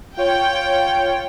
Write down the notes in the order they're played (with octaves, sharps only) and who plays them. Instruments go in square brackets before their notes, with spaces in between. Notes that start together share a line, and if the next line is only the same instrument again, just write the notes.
[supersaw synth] F4 C#5 [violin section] G5